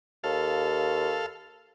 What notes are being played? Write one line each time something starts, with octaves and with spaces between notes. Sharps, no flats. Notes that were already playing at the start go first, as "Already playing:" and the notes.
D#2 A4 F5